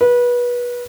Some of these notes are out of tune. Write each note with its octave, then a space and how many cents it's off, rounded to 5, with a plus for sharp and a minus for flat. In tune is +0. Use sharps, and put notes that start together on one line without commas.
B4 -25